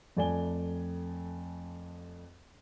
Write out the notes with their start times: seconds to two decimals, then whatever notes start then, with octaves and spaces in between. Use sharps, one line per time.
0.17 F2 A3 D5 G#5 G7